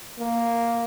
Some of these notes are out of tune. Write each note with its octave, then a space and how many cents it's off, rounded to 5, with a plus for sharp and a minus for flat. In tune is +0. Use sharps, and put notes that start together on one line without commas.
A#3 +0